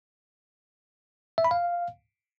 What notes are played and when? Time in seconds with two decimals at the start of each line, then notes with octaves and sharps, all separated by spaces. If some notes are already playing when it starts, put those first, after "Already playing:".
1.38 E5
1.45 B5
1.51 F5